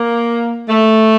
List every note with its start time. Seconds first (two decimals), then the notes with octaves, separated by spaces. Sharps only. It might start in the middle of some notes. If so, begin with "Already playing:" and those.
Already playing: A#3
0.69 A3